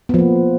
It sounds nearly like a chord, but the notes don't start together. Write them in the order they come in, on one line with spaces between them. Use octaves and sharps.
B3 F3 A#3